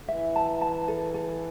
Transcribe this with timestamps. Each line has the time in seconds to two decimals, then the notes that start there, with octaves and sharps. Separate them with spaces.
0.03 D3
0.08 E3 E5
0.36 A5
0.61 A5
0.88 A4
1.14 A4